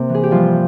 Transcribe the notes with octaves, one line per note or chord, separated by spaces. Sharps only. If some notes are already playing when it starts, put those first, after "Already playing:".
Already playing: C3 A#3 C4
E3
G#4
G4
G2 F3 F4